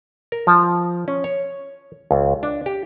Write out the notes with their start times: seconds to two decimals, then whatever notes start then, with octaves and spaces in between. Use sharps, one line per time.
0.32 A#4
0.47 F3
1.08 C#4
1.24 C#5
2.11 C#2
2.43 D4
2.66 G4